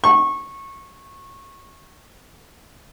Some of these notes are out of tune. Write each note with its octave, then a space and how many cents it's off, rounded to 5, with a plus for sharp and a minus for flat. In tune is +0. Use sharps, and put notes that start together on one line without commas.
C#6 -20